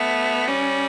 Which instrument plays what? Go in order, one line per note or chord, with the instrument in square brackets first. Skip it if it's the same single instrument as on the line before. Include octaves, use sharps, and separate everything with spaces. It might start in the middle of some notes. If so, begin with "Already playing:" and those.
Already playing: [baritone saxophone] A3 [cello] B3
[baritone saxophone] G3 [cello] C#4